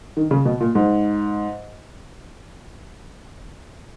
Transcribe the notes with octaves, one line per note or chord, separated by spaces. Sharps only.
D#3
C#3
B2
A#2
G#2